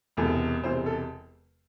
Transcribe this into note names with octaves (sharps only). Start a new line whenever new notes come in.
E1 E2 C3 A4
E1 E2 C3 C5
A4